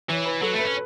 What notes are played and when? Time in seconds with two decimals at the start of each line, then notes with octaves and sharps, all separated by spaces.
0.10 E3 C#5
0.26 B4
0.42 F#3 A4
0.53 A3
0.59 B4
0.64 C#4